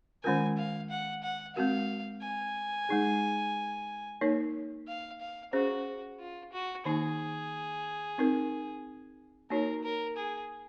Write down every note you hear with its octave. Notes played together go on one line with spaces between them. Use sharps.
D#3 G#3 C#4 F4 A#4 G#5
F5
F#5
F#5
G#3 C4 F#4 A#4 F5
G#5
G#3 D#4 G#4
A#3 D#4 A#4 C#5
F5
F5
C#4 F#4 G#4 C5
F4
F#4
D#3 A#3 D#4 G#4
C4 D#4 A#4
A#3 D#4 F#4 A#4 C#5
A#4
G#4